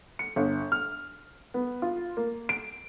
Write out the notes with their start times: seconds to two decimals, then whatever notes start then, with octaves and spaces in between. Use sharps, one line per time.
0.19 C#7
0.36 G1
0.72 F6
1.54 B3
1.82 F4
2.17 A#3
2.49 D7